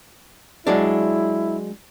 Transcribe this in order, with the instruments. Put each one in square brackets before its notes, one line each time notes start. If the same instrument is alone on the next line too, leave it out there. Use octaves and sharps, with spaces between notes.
[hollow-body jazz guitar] F#3 G#3 D4 [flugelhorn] E4